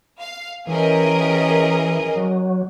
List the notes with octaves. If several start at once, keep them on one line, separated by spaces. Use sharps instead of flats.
F5
E3 C#4 G4 G#4 A#4 D#5
F#3